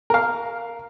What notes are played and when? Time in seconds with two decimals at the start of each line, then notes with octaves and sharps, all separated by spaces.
0.10 A#4 F5